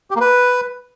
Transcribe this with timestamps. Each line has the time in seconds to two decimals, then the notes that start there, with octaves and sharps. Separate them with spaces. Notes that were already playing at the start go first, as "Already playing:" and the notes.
0.11 G4
0.16 A#3
0.21 B4